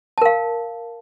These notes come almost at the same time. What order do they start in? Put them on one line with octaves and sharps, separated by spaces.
A5 A#4 F5